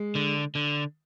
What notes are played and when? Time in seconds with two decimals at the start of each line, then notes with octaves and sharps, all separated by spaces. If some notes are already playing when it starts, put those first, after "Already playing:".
Already playing: G#3
0.15 D3
0.55 D3